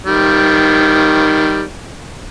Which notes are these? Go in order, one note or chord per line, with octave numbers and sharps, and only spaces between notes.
D#3 G3